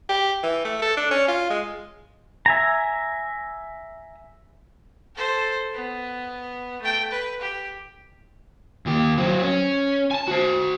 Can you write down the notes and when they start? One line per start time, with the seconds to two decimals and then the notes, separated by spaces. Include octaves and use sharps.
0.09 G4
0.43 E3
0.65 A3
0.82 A4
0.97 D4
1.11 C#4
1.28 F4
1.50 G#3
2.46 E5 G#5 A#5
5.16 A4 C5
5.74 B3
6.82 A3 G5
7.12 B4
7.41 G4
8.86 D#2 G4
9.18 F#3 C4
9.43 C#4
10.11 G#5 A5
10.28 F#4 C5